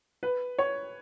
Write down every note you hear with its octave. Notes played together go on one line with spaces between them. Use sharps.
B4
C#5